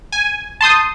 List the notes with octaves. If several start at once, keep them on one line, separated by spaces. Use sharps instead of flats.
G#5
A5 C6 D#6 G6